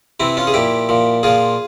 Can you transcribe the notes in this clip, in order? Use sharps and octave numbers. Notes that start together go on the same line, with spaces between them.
C3 E3 C4 E4
C#4 F4
G#4
A#2 F3 E4 G4
A#2 F3
A#2 F3 F4 G#4